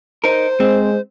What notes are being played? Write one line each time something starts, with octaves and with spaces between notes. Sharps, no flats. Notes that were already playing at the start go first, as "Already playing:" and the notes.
D#4 A#4 C5
G#3 C4